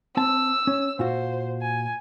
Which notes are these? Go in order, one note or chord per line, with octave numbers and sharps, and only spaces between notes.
C4 A5 E6
C#4
A#2 F4 F#4 C5
G#5